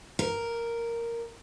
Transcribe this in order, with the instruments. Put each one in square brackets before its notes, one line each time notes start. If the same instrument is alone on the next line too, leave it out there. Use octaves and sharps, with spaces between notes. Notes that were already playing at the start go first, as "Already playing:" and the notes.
[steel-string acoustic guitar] A#4